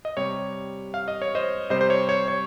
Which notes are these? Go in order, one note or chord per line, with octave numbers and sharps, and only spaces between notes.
D#5
C3 G3 C#5
F5
D#5
C#5
C5 D#5
C3 G3 C5 D#5
C5
C#5
C#5
C#5